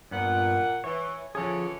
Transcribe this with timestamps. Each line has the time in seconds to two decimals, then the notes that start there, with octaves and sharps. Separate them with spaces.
0.11 G2 A#2 B3 F#5
0.84 E3 C#5
1.35 D3 E3 F3 C#4 G#4